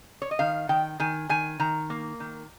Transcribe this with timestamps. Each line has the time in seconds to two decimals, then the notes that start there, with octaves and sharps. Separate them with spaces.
0.22 C#5
0.31 D#5
0.39 D#3 F5
0.69 D#3 G5
1.00 D#3 G#5
1.29 D#3 G#5
1.60 D#3 A#5
1.90 A#3
2.20 D#3